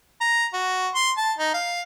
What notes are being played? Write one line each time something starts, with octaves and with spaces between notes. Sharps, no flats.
A#5
F#4
C6
A5
D#4
F5